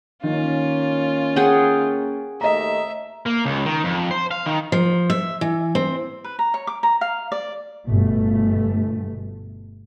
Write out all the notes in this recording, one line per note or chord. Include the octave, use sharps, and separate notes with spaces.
D#3 A#3 C#4 F4
G#4 F#5 G5
D#2 A3 D#5 E5 A#5
A#3
C#2
D#3
F2
C5
F5
D#3
F3
E5
E3
C4
B4
A#5
C#5
D6
A#5
F5
D5
G1 G2 B2 A3